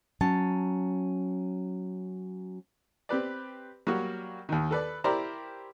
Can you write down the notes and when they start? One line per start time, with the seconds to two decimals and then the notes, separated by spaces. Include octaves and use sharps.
0.21 F#3 C#4 A5
3.09 C4 G4 B4 D5
3.87 F#3 G3 A#3 F#4
4.49 D#2 D#3
4.71 A4 B4 D5
5.04 E4 G4 A#4 C5 D5 A#5